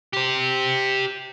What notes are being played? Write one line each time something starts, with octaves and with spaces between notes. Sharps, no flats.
G4 C5